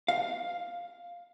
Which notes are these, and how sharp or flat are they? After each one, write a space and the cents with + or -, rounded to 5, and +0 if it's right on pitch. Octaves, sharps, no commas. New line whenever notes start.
F5 +5